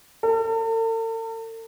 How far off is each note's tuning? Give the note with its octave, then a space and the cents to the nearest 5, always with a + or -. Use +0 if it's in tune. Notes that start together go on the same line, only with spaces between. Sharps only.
A4 +45